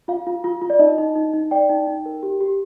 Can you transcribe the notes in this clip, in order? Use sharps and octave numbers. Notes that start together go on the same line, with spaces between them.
F4 F5
F4
F4
F4
D5
D#4 D#5
D#4
D#4
D#4
D5 G5
D#4
D#4
A#4
G4
G4